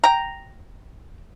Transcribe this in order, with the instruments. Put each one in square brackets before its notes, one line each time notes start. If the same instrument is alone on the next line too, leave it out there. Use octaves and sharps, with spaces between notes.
[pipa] G5 A#5